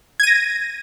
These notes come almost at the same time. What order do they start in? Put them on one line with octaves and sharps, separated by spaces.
G#6 D#7 A#6